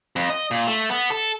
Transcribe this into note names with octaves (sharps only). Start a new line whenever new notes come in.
F2
D#5
A#2
A3
B3
A4